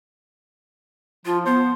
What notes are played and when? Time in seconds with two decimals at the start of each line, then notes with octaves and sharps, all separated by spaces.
1.26 F3 F4
1.46 B3 C5